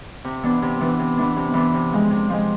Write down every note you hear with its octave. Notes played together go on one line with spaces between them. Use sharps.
C3
E3 B3 D4
C3
E3 B3 D4
C3
E3 B3 D4
C3
E3 B3 D4
C3
F3 G#3
C3
F3 G#3